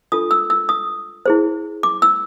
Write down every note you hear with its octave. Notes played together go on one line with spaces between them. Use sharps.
D4 F4 A4 D#6
E6
E6
D#6
E4 G#4 C5
D6
E6